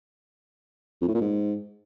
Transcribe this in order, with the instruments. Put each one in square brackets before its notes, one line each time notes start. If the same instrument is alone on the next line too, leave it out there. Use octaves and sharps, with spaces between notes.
[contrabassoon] F2
A2
A#2
G#2